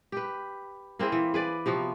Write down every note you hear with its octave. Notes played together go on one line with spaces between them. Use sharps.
G4 B4
A#3 C4 E4 G#4
E3
G#4 B4 D5
C3 F3 B3 F#4